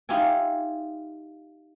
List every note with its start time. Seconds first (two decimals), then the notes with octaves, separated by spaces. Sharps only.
0.09 D#4 F4 G4 E5 G#5